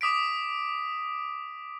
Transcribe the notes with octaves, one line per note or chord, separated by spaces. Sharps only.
D6 D#6 B6 D7